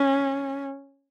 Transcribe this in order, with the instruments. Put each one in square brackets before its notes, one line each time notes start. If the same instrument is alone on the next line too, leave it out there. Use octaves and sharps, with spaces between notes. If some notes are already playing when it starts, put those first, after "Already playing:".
Already playing: [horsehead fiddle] C#4